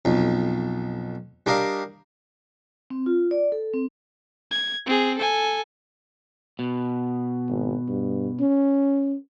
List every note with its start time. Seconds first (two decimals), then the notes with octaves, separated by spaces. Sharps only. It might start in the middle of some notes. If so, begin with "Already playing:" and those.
0.05 B1 F2
1.46 G3 D4 A#4 D#5 F5
2.90 C4
3.06 F4
3.31 D5
3.52 A4
3.74 C4
4.52 G#6
4.87 C4 G#4
5.18 A4 G#5
6.59 B2
7.49 G#1
7.88 G2
8.40 C#4